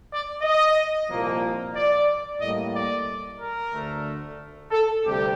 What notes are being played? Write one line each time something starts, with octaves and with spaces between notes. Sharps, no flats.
D5
D#5
C2 A#2 F3 A#3
D5
A2 G3 A#3 D#5
D5
A#4
D2 D3 A3
A4
D2 C3 G3 G4